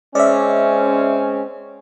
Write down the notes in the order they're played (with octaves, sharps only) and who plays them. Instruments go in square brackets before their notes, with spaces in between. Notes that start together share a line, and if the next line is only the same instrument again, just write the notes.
[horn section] G#3 C4 C#4 [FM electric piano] D5 E5